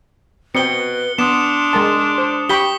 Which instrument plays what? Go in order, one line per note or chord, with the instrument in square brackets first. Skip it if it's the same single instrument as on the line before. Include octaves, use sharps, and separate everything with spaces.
[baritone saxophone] B2 [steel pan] C4 G5 [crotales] C#7 G7
[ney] B4
[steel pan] B3 [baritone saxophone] D4 [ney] C6 [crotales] D#6 E7
[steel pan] G#3 A#4 A5
C5
[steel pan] G4 G5 B5 [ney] C#6 [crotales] B6 G7